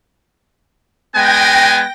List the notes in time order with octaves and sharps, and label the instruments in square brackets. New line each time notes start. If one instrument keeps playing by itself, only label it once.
[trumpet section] G#3 B3 G#5 [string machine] G5 A#6